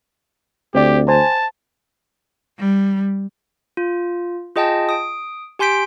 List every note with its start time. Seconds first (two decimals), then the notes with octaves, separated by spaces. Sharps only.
0.75 D2 C4 G4 D5
1.08 C5 G#5 A5
2.59 G3
3.77 F4
4.56 F4 G#4 D#5 G5 A5
4.89 D#6 D7
5.59 G4 G#5 C6 G6 B6 D7